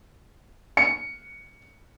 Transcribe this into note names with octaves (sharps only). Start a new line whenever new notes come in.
C#7